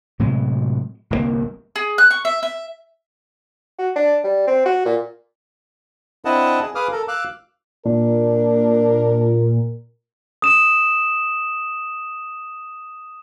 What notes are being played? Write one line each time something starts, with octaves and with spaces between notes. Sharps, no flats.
A2 C3 F#3 G#3
G1 C2 C3 A#3
G#4
F#6
C#6
E5
E5
F#4
D4
G3
C4
F#4
A#2
C4 D4 E4 D#5 F#5 A5
G#4
G#4 B4 F5 D6 D#6 F6
A4 A#4
F5 D6 E6 F#6
A#2 D4 A#4
D#6 E7